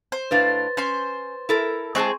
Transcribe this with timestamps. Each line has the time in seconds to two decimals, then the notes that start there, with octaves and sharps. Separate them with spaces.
0.12 C5
0.31 A2 D4 B4 F5 A6
0.77 C#4 C5 C6
1.49 E4 A4 A#4
1.95 G#3 C4 G#4 A5 C#6 G6